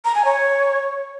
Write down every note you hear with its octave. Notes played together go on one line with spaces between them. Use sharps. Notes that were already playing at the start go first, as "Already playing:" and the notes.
A#5
G#5
C#5